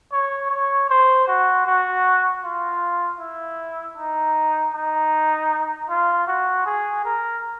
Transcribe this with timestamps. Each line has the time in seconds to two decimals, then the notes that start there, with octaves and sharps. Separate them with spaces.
0.12 C#5
0.51 C#5
0.89 C5
1.27 F#4
1.66 F#4
2.44 F4
3.20 E4
3.97 D#4
4.74 D#4
5.89 F4
6.27 F#4
6.66 G#4
7.05 A#4